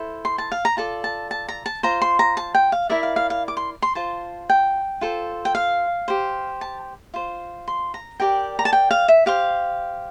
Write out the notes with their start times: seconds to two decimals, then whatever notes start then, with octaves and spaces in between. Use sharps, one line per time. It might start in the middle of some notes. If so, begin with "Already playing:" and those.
Already playing: E4 A4 C5
0.25 C6
0.38 A5
0.52 F5
0.65 A#5
0.77 F4 A4 D5 A5
1.04 A5
1.31 A5
1.48 A#5
1.66 A5
1.83 F4 C5 A#5
2.02 C6
2.19 A#5
2.37 A5
2.55 G5
2.72 F5
2.89 E4 A#4 D5 E5
3.03 F5
3.16 F5
3.30 F5
3.48 D6
3.57 C6
3.82 C6
3.95 F4 C5 A5
4.50 G5
5.01 F4 A4 C5
5.45 G5
5.55 F5
6.08 G4 C5
6.61 A5
7.14 F4 C5
7.68 C6
7.94 A#5
8.20 G4 A#4 D5 G5
8.59 A#5
8.65 A5
8.73 G5
8.91 F5
9.08 E5
9.26 G4 C5 F5